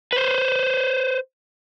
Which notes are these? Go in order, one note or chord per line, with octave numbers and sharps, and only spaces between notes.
B4 C5